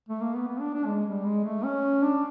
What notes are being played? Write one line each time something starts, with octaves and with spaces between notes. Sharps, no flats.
A3
A#3
B3
B3
D4
D4
G#3
G3
G#3
A3
C#4
D4